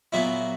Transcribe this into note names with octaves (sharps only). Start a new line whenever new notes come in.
A#2 F#3 B3 E4 G#4